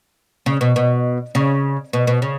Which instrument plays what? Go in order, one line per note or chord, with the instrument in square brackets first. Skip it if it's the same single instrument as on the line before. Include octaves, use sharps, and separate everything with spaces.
[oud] C#3
B2
B2
C#3
B2
B2
C#3